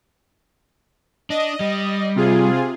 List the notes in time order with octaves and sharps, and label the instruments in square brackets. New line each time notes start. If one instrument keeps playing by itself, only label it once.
[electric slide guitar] D4 [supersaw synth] D#5
[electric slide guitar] G3
[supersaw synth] C3 F4 G#4